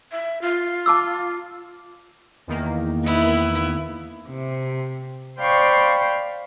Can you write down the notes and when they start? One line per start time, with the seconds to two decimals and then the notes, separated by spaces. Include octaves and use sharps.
0.11 E5
0.42 F4
0.86 A5 D6 E6
2.47 E2 D#3 A#3
3.06 B3 E4
4.28 C3
5.39 C5 D5 F5 G5 B5 C#6